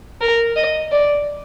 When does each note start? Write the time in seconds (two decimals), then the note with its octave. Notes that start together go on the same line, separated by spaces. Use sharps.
0.21 A#4
0.56 D#5
0.92 D5